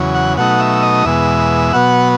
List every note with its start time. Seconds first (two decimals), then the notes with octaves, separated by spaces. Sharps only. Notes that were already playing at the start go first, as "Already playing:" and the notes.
Already playing: E2 C#3 F#3
0.15 F#5
0.37 B2 F#3 A3 D#4 F#5
0.60 E5
0.82 D#5
1.05 E2 B2 G#3 E5
1.73 B2 F#3 B3 F#5